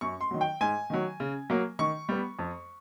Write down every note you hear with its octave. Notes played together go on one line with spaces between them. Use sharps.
F#2 C#6
C6
D#3 F#3
G5
G#2 G#5
D#3 F#3
C#3
F#3 A#3
D#3 C#6
G3 B3
F2